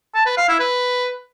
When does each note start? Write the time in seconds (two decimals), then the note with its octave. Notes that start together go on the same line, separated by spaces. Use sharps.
0.15 A5
0.26 B4
0.37 F5
0.48 E4
0.60 B4